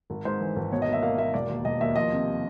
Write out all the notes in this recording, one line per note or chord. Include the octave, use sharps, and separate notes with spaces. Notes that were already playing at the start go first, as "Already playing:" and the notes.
G#1
G#2 C5
E3
G#1
B2 C#5
D#5
A#3
E5
A#3 F5
A#3 E5
E1 D5
D#2
E1 D#5
D#2 E5
F3 D#5
C3